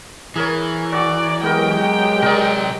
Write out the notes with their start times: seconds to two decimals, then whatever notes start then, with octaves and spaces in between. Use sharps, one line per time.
0.36 E3 G#4 A#4 C#5
0.92 F#4 D5
1.43 F#3 G#3 B3 G4 A#4 G5
2.23 C3 D#4 A#4 D5